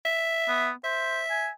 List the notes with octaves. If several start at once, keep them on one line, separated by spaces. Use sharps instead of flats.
E5
B3
C5 E5
G#5